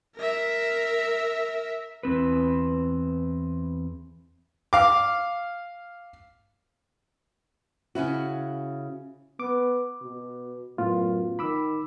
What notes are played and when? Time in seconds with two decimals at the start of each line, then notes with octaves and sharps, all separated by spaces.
0.17 A#4 E5
2.03 E2 C4 B4
4.73 F5 D6
7.95 C#3 C#4 E4 F#4
9.40 B3 D6
10.02 B2
10.78 F#2 A2 B3 F4
11.39 D#3 B5 D6 E6